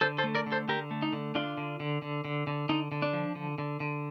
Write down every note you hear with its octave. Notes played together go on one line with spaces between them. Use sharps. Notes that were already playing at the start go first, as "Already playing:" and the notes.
D3 A4 C5
A4 C5
A3
A#4 D5
D3
A4 C5
D3 G4 A#4
A3
D#4
D3
D3 D4 F4
D3
D3
D3
D3
D3
D3 D#4
D3
D4
F3
D3
D3
D3